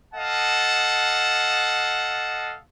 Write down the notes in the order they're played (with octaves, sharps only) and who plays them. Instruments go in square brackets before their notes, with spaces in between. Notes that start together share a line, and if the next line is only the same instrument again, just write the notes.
[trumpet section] A4 D#5 F5 F#5 A5